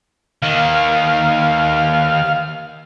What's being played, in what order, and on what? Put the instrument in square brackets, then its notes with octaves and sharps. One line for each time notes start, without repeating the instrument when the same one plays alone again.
[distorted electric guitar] D#2 D#3 [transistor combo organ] F5